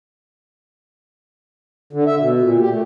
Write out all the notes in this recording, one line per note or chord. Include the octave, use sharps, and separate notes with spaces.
D3
E5
B2
A#2
G4
A3